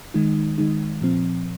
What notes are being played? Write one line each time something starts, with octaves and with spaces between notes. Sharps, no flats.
D#3 G#3 D#4
D#3 G#3 D#4
A#2 F3 C4